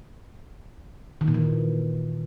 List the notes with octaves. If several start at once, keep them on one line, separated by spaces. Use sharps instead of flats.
D#3
A#2
E3